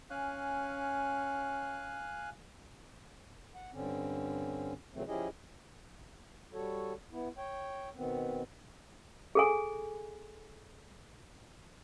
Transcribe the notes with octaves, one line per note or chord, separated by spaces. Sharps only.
C#4 F5 G#5 F#6
F#5
G2 D3 C4 C#4
A#2 C#3 E3 F#3 A3 C4
F3 C#4 E4 G4 G#4 D#5
G3 F#4 A4 C#5
B3 E4
C#5 G5
B2 D#3 B3 C4
G#4 A4 G#5